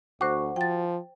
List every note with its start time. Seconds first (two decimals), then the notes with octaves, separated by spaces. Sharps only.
0.21 D2 F#4 C5 D6
0.56 F3 G5 A6